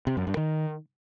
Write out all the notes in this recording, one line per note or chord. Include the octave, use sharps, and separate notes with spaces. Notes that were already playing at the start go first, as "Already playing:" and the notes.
C3
F#2
G2
D#3